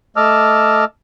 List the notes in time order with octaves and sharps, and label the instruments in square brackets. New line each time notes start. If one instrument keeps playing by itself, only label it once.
[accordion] A3 D#5 A5 D6 E6 F6